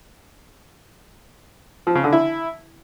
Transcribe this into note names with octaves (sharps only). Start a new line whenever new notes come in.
F3
C#3
D3
E4